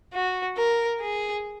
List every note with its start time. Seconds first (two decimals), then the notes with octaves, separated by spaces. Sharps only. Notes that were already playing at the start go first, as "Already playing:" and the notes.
0.13 F#4
0.57 A#4
1.01 G#4